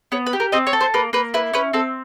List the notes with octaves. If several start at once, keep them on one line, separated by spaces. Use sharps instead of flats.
B3 C#5
B4
G4
A#4
C4 D#5
C#5
A4
C5
A#3 B4
A#3 B4
E4 B4
C#4 B4
C4 A4